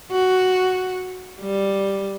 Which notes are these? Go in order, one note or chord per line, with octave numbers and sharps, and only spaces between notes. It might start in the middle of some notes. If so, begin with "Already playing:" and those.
F#4
G3